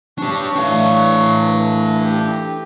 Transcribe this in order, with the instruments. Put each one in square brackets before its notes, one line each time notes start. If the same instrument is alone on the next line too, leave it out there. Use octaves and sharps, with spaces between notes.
[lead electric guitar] D4 G4 [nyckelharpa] C#5 C#6
[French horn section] E3 A3 [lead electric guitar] D4 F5
[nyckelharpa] G4